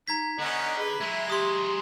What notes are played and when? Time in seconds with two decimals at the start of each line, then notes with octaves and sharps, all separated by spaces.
0.08 D#4 A#5 G#6 B6
0.39 D3 B3 C#4 D#4 D#5
0.78 G#4 B4
1.00 F#3 G#3 E4 E5
1.30 G4 C6 D#6